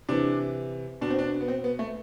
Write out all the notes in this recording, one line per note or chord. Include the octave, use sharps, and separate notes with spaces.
C3 E3 D4
B2 D4
C4
D4
B3
C4
B3
A3